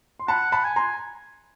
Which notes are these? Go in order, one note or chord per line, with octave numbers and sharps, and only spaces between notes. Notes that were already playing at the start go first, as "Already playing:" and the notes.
C6
F#5 A5 B5
A5 B5
G#5
A#5 C6